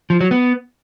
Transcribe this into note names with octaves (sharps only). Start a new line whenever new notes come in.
F3
F#3
B3